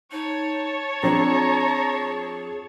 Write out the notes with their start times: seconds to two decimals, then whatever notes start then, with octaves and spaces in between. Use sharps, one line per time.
0.12 D#4 C#5 A5
1.03 F3 C4 D4 G#4 A#5